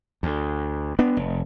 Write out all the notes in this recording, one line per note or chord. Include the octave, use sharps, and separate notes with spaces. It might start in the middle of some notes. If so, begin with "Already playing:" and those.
D2
B3 D4
F1